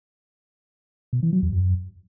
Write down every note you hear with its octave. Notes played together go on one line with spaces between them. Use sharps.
B2
E3
F#3
E2
F#2